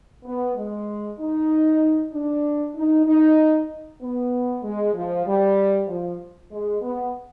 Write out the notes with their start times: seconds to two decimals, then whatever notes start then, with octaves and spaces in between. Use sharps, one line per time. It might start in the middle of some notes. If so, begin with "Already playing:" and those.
0.25 B3
0.55 G#3
1.18 D#4
2.12 D4
2.75 D#4
3.06 D#4
4.01 B3
4.63 G#3
4.94 F3
5.26 G3
5.88 F3
6.51 G#3
6.82 B3